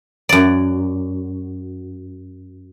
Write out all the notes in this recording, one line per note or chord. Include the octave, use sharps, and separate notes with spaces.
F#2 D5